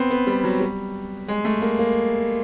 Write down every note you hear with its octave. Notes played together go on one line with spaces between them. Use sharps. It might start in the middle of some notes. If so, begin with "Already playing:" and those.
Already playing: B3 C4
B3
G3
F#3
G3
G#3
A3
A#3
A#3